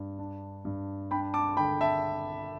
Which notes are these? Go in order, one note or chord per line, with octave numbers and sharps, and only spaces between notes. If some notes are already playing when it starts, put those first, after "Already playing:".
Already playing: G2
D4
G2
D4 G5 B5
A5 D6
D3 G5 B5
E5 A5